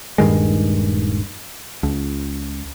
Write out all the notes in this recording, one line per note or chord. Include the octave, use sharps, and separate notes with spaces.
D#1 G2 D#3 G#3
C#2